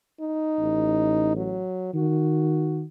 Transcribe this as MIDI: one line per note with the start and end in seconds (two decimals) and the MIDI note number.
0.21 1.33 63
0.59 1.62 33
1.37 1.93 54
1.94 2.83 51
1.94 2.82 66